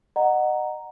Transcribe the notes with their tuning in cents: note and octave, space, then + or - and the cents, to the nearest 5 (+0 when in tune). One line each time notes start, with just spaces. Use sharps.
D#5 -30 F#5 +0 A#5 +0